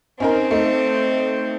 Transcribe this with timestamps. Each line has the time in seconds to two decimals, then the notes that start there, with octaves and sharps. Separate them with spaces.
0.20 C4 C#4 D#4 A#4
0.51 A3 D#4